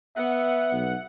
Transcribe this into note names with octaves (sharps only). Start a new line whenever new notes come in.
B3 E5 F#5
B1